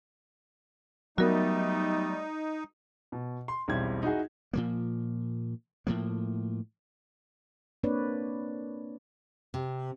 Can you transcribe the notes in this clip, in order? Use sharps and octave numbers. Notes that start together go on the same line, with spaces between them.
F#3 G3 A3 B3 D#4 F#4 A#4
B2
C6
E1 B1 G3 C4 E4 G#6
D#4 E4 F#4 G#4
A#2 F3 A#3
A2 F3 A#3
A#3 C4 D4 B4 C#5 D5
C3